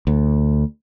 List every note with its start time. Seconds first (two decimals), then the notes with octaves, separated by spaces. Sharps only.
0.07 D2